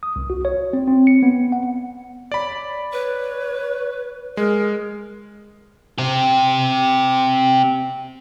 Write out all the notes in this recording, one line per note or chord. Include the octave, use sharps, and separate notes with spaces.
D#6
C2
F#4
C#5
C4
C4
C#7
B3
F#5
C#5 D5 B5
B4 C#5
G#3 G#4 A#4
C4 G4